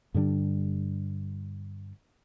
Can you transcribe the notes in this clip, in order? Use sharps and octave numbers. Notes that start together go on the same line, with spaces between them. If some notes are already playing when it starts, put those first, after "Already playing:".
G2 D3 G3 D4